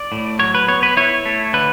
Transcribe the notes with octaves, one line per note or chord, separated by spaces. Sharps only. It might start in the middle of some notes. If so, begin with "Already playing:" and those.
Already playing: D5
A2
F#3 C#5
B4
B3 C#5
B4
E4 C#5
A3
D3 B4